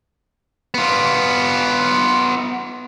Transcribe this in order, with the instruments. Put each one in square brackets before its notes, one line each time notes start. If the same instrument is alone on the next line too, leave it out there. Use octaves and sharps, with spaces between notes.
[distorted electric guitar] B3 F4